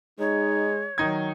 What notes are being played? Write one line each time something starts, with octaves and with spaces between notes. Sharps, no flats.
G#3 D#4 C#5
D#3 F#3 D#4 G#6